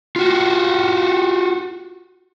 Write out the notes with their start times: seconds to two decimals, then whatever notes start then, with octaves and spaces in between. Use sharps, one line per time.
0.16 F4 F#4